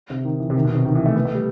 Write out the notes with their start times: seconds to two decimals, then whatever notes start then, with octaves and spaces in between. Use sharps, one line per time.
0.10 C3
0.25 D#3
0.40 E3
0.50 C3
0.56 D#3
0.65 B2
0.75 C3
0.85 D#3
0.95 E3
1.06 A3
1.15 B3
1.25 A3
1.35 G3